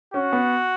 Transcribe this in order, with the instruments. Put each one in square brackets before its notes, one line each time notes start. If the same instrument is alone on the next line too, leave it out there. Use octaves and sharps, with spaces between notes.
[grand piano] C#4 [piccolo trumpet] F#4
[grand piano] B3